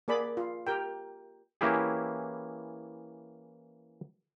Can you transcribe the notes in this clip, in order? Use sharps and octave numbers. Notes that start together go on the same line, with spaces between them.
A#3 G#4 D5 B5
F4
G4 A#4 G5
E3 A#3 C#4 E4 G4 G#4